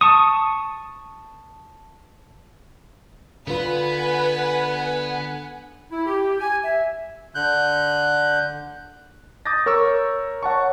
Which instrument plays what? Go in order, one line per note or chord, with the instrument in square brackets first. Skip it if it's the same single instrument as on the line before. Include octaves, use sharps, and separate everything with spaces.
[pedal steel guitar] A5 C#6 D#6
[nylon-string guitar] D3 F4 [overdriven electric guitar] B3 [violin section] B4 [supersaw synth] F#5 G#5
[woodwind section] E4
G4
G#5
E5
[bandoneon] D3 F#6 G6
[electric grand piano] D6 D#6 G6 A6 A#6
A#4 C#5 C#6 E6
C#5 F#5 A5 C#6